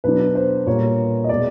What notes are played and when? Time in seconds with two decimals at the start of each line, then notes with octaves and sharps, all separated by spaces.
0.04 B2 F#3 B3 D4 B4
0.35 C5
0.66 A#2 G3 A#3 C#5
1.24 D#5
1.29 B2 G#3 D5